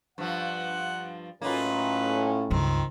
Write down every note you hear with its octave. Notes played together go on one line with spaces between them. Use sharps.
G2 F3 F#5
A2 F#3 A#3 C#4 D#4 F4 B4
C#2 G2 D#3 F3 C4